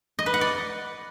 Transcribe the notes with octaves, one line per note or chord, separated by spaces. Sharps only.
D#5
B4
F#5
D5